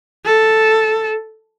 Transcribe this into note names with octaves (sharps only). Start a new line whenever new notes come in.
A4